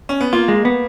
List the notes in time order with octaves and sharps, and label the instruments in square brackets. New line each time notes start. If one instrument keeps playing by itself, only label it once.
[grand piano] C#4
B3
[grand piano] A#3 [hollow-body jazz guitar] F4
[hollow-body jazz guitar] G#3
B3